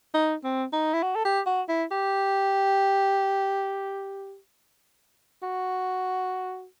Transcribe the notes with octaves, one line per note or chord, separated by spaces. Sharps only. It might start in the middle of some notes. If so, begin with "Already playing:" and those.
D#4
C4
D#4
E4
F#4
A4
G4
F#4
E4
G4
F#4